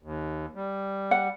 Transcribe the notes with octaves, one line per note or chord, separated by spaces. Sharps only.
D#2
G3
F#5